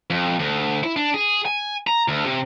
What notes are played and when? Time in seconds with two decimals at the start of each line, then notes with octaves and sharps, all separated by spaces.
0.10 F2
0.39 D2
0.84 E4
0.96 D4
1.14 G#4
1.45 G#5
1.87 A#5
2.08 D2
2.26 C3